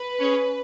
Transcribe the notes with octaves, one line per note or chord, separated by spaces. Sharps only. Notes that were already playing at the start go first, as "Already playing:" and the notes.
Already playing: B4
C#4 G#4